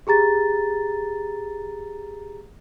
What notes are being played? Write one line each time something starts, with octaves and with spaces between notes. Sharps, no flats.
G4 G#4 A#5 A6